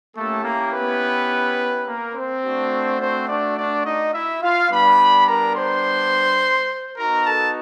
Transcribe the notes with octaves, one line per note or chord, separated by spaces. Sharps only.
A3 A#3 C#4 E4 G4 A4
A#3 A#4
B3 B4
A#3 A#4
C4 C5
A3 D4 F#4
C4 C5
D4 D5
D4 D5
D#4 D#5
E4 E5
F4 F5
G3 B3 D4 B4 B5
A#4 A#5
C5 C6
B3 D#4 F#4 A#4 A#5
A4 A5